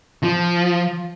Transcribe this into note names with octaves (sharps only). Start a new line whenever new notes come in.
F3